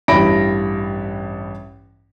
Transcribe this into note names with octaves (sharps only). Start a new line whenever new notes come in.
A1 G2 E4 B5 A#6 D7